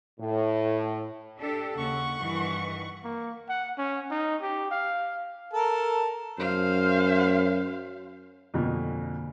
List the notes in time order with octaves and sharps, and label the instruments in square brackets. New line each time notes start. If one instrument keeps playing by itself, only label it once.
[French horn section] A2
[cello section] D4 G4 A4
[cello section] D#2 C#3 [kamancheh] F#5 C#6
[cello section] G2 D#3 E3
[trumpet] A#3
F#5
C#4
D#4
G4
F5
[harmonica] A4 A#4 A5
[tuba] F#2 [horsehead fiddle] C5 F5
[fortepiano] F2 B2 [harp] D3 A#3 G#5